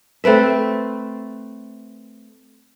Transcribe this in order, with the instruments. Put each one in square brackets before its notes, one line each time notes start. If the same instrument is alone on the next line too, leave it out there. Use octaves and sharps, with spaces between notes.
[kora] A3 C4 B4 E5